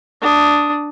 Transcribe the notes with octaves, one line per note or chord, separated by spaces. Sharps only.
D4 D#6